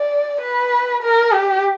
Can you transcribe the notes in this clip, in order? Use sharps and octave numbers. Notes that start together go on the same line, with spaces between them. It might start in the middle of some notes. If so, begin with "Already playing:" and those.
Already playing: D5
B4
A#4
G4